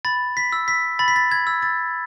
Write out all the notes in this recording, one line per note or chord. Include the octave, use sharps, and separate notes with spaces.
B5 A6
B6
E6
B6
B5 A6
B6
A6
G#6
E6
A6